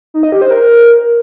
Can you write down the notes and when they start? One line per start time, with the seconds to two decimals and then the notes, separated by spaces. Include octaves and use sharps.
0.14 D#4
0.23 D#5
0.32 G4
0.42 C5
0.51 A#4